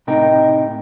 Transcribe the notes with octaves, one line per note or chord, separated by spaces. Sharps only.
A2 C3 D#4 A#4 G5